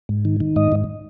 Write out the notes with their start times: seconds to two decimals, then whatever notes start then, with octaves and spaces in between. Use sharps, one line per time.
0.09 G#2
0.25 D#3
0.40 D#3
0.56 G#2 D#5
0.72 G#2